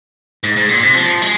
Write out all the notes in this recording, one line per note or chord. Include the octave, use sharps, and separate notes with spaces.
G#2
G#2
A#2
C3
F3
G#3